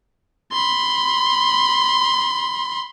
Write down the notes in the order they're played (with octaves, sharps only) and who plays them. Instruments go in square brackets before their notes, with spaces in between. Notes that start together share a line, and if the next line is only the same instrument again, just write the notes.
[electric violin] B5 C6